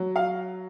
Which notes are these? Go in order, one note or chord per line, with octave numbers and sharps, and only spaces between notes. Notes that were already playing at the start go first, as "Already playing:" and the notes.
Already playing: F#3
F5